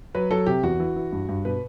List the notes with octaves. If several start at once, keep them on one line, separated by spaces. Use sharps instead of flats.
F#3 B4
F#3 A4
C3 G4
E2 F#4
E3
E3
G2
G2
B2 B4